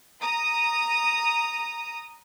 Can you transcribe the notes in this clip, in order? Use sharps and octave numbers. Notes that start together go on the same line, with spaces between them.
A#5 D#6